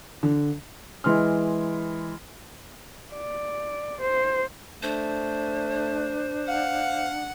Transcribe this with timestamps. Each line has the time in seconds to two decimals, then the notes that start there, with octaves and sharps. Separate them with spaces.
0.23 D3
1.04 E3 G#3 C6 F6
3.14 D5
4.01 C5
4.83 A3 D4 C5
6.48 F5 F#5